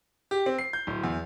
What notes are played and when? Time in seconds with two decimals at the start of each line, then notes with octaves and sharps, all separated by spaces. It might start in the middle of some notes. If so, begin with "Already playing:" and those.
0.31 G4
0.46 C4
0.58 C7
0.73 G6
0.87 D1
1.03 E2